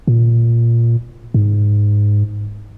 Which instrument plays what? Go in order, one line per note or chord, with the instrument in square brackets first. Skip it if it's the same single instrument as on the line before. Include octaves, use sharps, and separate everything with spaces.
[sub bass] A#2
G#2